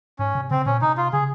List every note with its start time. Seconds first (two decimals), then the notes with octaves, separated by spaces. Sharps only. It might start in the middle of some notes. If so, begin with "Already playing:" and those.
0.19 G#2 C#4
0.35 C3
0.51 C#3 C4
0.66 A#2 C#4
0.81 C3 D#4
0.97 F4
1.13 C#3 G#4